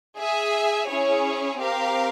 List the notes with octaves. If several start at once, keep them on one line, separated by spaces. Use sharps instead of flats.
G#4 E5 G#5
C#4 E4 G#4 C#5
C4 G4 A#4 F5